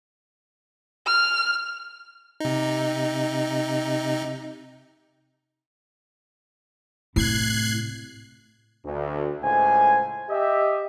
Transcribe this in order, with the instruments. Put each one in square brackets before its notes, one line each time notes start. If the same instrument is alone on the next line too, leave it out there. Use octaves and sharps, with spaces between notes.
[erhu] F6
[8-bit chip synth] C3 D#4
[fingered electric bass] A2 C3 [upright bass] E4 [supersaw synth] F#6 G#6 C7
[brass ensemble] D2
C#2 A2 C5 G#5
G4 D#5 E5